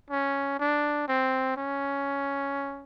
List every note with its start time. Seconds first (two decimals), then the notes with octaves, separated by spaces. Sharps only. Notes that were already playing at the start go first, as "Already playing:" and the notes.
0.10 C#4
0.59 D4
1.08 C4
1.56 C#4